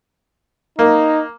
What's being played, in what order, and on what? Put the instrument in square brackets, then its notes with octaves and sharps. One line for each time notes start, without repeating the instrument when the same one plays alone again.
[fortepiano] A#3 [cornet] D#4